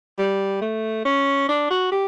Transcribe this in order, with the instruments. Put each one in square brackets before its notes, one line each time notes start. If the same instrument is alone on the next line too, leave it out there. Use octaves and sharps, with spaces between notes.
[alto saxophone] G3
A3
C#4
D4
F#4
G4